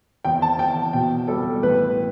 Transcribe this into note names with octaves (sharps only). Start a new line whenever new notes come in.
E2 G5
A5
E2 G5
B2 G5
G3 A4
A1 B4